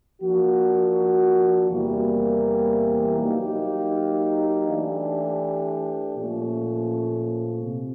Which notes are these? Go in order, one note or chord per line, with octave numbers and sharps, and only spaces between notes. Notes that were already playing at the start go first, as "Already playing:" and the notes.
F3 A#3 D4 F#4
E2 C3 E3 G3 A#3
F#3 A#3 D#4 G4
E3 A3 D4 G4
A#2 F3 A3 C#4
C3